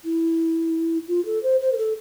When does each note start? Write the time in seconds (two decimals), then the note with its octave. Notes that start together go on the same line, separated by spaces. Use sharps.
0.05 E4
1.08 F4
1.26 A4
1.43 C5
1.60 C5
1.72 A#4
1.78 A4